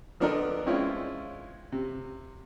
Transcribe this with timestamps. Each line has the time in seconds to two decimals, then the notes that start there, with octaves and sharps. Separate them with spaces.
0.20 F3 B3 D4 A4 A#4 D#5
0.66 G#3 C4 C#4 E4 F4 C#5
1.72 C3